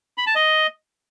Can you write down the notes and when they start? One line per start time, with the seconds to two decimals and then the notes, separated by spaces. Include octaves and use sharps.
0.18 B5
0.27 A5
0.35 D#5